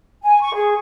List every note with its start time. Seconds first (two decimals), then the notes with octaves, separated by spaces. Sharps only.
0.22 G#5
0.41 C#6
0.53 G#4